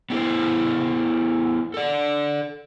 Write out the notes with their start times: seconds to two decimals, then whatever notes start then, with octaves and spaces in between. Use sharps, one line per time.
0.10 B3 D4 E4 F4 A4 C5
1.74 A4 D5